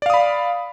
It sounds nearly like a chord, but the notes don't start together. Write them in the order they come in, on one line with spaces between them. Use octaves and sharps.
D5 F5 D#6 B5